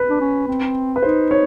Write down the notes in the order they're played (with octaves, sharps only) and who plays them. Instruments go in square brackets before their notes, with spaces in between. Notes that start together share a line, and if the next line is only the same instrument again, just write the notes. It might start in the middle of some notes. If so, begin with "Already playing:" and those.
Already playing: [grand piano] B4
[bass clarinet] D4
C#4
C4
[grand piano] B4
[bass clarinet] D#4 [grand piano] C5
[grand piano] C#5